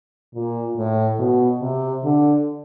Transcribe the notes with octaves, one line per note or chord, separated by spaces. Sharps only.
A#2
A2
B2
C3
D3